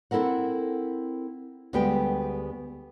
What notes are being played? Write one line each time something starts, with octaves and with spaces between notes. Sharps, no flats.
C4 E4 A4 A#4 F#5
D2 G3 G#3 B3 G4 G5